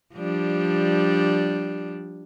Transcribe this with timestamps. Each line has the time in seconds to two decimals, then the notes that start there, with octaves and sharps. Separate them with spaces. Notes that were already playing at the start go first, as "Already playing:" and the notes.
0.15 F3 G3 D4